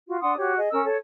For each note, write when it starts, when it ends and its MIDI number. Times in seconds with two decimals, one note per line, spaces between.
0.08 0.18 65
0.08 0.18 66
0.21 0.35 62
0.21 0.35 78
0.21 0.35 84
0.21 0.35 87
0.37 0.55 66
0.37 0.55 67
0.37 0.55 73
0.57 0.68 68
0.57 0.68 75
0.71 0.84 61
0.71 0.84 70
0.71 0.84 88
0.85 0.96 69
0.85 0.96 73